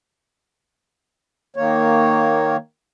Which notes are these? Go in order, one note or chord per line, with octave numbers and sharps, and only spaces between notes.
D#3 A#3 C#5